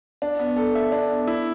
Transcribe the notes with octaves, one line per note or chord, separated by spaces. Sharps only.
D4
B3
A4
E5
D4
B3
E4